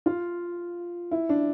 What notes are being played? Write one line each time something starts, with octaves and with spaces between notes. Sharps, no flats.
F4
E4
D4